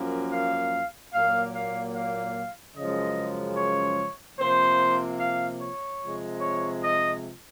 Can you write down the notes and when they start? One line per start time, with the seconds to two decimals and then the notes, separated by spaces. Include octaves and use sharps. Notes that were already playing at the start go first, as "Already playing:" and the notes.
Already playing: F#2 F3 A#3
0.32 F5
1.13 A#2 F#3 A#3 F5
1.55 F5
1.96 F5
2.76 F#2 C#3 F3 G#3 D#5
3.57 C#5
4.39 C3 F3 A#3 C5
5.20 F5
5.61 C#5
6.01 C3 F3 G#3
6.41 C#5
6.83 D#5